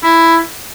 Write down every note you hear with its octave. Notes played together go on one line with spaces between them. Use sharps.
E4